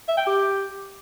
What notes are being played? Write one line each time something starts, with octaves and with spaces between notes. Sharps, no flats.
E5
G5
G4